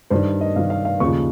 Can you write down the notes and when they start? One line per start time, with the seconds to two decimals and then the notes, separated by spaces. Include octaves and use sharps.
0.10 G2 D#3 C5
0.41 D#5
0.56 G2 F5
0.59 D#3
0.70 F5
0.85 F5
1.00 D#2 C#6
1.03 C#3 F3